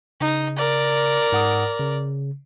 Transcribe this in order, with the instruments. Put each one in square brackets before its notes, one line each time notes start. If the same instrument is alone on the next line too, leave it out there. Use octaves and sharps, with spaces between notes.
[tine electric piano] C#3 [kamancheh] D#4
[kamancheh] A#4 D5
[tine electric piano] G#2 F#5 D#6
C#3